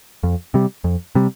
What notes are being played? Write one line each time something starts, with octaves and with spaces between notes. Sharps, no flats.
F2
C3 G3
F2
C3 G3